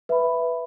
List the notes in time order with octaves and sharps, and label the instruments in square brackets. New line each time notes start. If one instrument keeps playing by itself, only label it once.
[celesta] B4 E5 B5